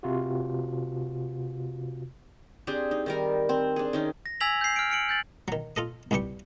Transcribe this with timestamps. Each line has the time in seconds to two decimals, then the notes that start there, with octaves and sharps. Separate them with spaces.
0.03 C3 F4 F#4
2.67 C4 D4 G4 G#4
2.91 D#4
3.06 D#3 G3 A#4
3.49 C4
3.76 D4 G#4
3.93 D#3 C#4 D#4
4.26 A#6
4.40 G#5 E6 G#6 B6 F7 F#7
4.61 G6 C7
4.76 F6 C7 D7
4.90 F6 C#7 D7 F#7
5.09 G6 A6 F#7
5.48 D#3 F#3
5.76 F4 A4 D#5
6.11 C2 G2 G3 G4 C#6